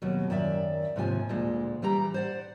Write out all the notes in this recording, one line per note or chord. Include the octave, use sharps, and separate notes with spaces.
D#2 B2 F#3
F#2 D#3 D5 E5
D#2 G#2 C3 F3 G#5
D2 A#2 G#3
E3 G3 G4 A#5
C5 D5 F#5